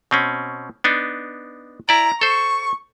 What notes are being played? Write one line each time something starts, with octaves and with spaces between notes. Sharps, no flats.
B2 C4 C#4
B3 D4 D#4
E4 D5 A#5
A4 C5 C#6